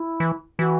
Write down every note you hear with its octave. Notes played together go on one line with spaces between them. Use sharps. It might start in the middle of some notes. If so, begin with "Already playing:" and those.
Already playing: E4
E3
E3 F#4